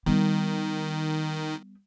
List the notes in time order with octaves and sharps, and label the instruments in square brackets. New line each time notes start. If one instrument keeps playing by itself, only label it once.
[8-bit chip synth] D#3 [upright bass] G3 B3